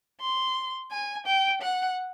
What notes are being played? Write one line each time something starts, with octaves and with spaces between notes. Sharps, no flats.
C6
G#5
G5
F#5